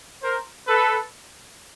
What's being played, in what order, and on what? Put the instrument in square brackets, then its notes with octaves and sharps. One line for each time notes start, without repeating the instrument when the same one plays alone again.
[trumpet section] A#4 C5
A4 B4